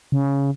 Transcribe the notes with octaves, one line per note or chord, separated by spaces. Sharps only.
C#3